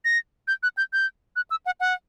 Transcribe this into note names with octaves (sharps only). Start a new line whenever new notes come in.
A#6
G6
F#6
G6
G6
F#6
E6
F#5
F#5